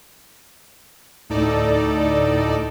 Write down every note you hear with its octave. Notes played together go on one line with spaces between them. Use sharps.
D2 A2 D#4 A4 D5